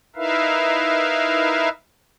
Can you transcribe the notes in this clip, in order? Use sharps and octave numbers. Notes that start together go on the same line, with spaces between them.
D#4 E4 A#4 B4 E5 F5